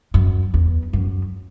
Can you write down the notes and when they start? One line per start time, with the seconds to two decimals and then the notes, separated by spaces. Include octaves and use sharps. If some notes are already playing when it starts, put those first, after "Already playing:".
0.14 F#2
0.54 E2
0.93 F#2